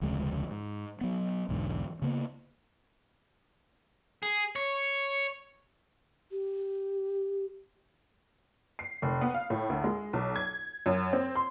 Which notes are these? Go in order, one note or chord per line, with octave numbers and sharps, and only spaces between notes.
F1 D2 C#3 G#3
G#2
F#3 B3
B1 E2 G#2 D3
C#3 A#3 B3
G#4
C#5
G4
C7
F1
B3
F5
A2
D2
G#3
B1
G#6
F#2
C4
C6